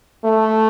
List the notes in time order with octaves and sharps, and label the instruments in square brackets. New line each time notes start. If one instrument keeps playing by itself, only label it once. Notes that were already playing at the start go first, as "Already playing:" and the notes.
[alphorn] A3